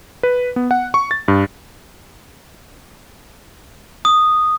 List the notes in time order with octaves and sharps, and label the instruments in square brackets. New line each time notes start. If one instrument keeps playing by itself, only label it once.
[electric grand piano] B4
B3
F#5
C#6
A6
G2
[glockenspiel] D#6